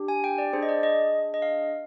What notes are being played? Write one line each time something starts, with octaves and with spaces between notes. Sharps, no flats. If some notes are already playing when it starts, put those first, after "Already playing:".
Already playing: D4 G4
G#5
G5
D5
D4 G#4 C5
D#5
D5
D#5
D#5
F5